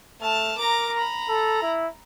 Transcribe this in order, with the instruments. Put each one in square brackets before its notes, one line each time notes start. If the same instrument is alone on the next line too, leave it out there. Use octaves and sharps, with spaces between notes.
[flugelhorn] A3 [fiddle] A5 F6
[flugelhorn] A#4 [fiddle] A#5 D6
[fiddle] A#5 B5
[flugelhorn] A4
E4